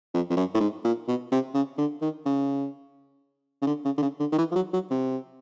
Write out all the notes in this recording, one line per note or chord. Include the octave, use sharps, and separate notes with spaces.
F2
F2
F#2
A2
G#2
A#2
B2
C3
C#3
D3
D#3
C#3
C#3
D3
C#3
D3
C#3
D3
D#3
E3
F3
F#3
F#3
C3